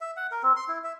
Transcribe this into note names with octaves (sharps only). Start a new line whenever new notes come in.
E5
F#5
A#4
C4
C6
E4
E5